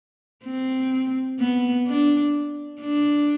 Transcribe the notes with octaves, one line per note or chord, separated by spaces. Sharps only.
C4
B3
D4
D4